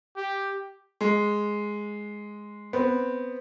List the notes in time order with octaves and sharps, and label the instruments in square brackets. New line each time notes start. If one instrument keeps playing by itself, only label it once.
[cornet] G4
[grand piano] G#3
[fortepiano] B3 C4